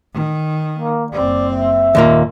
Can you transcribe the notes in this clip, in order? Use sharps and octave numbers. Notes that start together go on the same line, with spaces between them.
D#3
A#3
F#1 C4 D5
E5
D#2 A#2 A#3